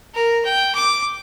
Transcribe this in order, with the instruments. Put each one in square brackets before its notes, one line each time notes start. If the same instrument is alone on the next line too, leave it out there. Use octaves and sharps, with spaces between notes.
[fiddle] A#4
G5
D6